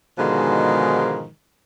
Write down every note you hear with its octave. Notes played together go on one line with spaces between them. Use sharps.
G#2 B2 D3 D#3 F3 G#3